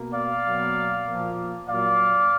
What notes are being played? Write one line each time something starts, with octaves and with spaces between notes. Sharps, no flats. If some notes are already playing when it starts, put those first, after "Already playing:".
Already playing: B2 A#3
D5 F5
B2 F#3 A#3
A#2 F3 A#3
A#2 F#3 A#3 D5 F5